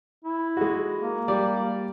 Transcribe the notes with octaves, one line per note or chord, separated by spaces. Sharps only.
E4
G#3 F#4
A#3
G3 D5